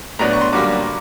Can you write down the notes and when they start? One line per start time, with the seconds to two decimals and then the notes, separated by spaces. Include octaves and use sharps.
0.19 A2 F#3 B3 D4 A#5
0.33 C#6
0.41 C6
0.53 F#2 D3 G3 A#3 D6